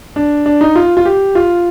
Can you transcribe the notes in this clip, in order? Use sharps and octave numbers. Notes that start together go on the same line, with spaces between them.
D4
D4
D#4
F4
F4
G4
F4